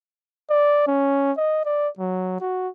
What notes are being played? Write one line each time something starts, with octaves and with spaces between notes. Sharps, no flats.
D5
C#4
D#5
D5
F#3
F#4